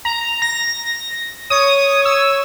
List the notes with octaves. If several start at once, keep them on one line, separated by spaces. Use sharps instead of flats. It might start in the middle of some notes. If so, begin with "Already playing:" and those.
A#5
A#6
C#5 D#6
E6